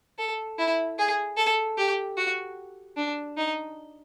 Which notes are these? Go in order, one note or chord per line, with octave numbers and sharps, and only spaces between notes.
A4
E4
G#4
A4
G4
F#4
D4
D#4